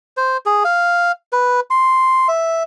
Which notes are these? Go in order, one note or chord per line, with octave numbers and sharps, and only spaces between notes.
C5
G#4
F5
B4
C6
E5